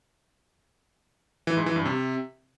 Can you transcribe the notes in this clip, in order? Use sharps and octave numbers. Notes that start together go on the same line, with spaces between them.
E3
G#2
E3
G2
C3